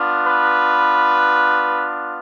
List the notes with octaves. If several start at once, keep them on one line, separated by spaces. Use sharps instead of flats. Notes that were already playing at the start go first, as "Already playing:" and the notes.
Already playing: B3 D4 F4
B4